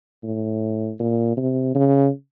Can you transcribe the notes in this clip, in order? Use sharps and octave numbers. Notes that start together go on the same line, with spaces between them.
A2
A#2
C3
C#3